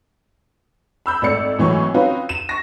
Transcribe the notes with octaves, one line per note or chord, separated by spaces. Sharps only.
B5 E6 G6
G#1 A3 D5 C#7
G#1 A2 E3 F#3 G#5 C#6
C4 C#4 D#4 F4 F#4 B4
D#7 E7
C#6 A#6